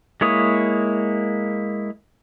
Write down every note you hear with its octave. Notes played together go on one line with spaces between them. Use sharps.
G#3 A#3 E4 C#5 D#6